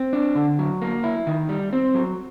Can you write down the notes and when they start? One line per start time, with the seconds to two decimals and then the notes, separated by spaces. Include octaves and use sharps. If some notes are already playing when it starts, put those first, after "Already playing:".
Already playing: C4
0.13 D4
0.35 D3
0.59 F#3
0.82 A#3
1.04 E4
1.27 D#3
1.49 G3
1.73 C4
1.95 F#3